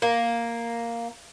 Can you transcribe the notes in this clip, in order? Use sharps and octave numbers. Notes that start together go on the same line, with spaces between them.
A#3